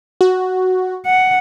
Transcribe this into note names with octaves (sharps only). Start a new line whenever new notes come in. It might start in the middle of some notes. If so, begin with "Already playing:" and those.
F#4
F#5